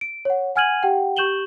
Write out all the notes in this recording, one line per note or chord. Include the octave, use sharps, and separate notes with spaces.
D7
C#5 F#5
F#5 G#5 F6 G#6 D#7 F#7
G4 F#5 G5
G4 C#6 G6 E7 F#7 G7